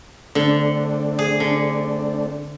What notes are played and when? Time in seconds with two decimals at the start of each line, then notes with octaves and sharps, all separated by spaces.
0.35 D3 A3 C4 D4
1.19 G#4
1.40 D3